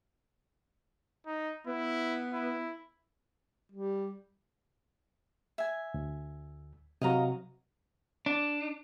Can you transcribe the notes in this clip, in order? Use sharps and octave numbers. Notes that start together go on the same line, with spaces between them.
D#4
B3 E4
E4
G3
E5 G#5
D2
C3 F#3 F#4 D#5 F5 A#5
D4